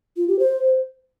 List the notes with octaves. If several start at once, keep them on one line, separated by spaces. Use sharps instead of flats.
F4
G4
C5